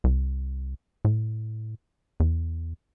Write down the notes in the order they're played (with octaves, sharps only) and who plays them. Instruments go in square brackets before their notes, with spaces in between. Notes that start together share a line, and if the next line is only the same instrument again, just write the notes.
[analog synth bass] C2
A2
E2